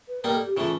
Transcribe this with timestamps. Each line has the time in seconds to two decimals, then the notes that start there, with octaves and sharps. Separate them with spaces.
0.08 B4
0.24 G3 A#3 D#4 A#4
0.34 A4
0.46 G4
0.56 C#3 E3 A3 F4